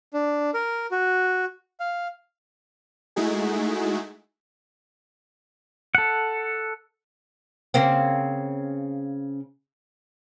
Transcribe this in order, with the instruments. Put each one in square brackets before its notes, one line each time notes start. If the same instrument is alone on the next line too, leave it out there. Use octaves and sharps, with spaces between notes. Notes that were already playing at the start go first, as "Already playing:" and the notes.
[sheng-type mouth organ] D4
A#4
F#4
F5
[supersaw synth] G#3 A3 D#4 E4 F#4 G#4
[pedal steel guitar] A4 F#5
[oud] C#3 A#3 C4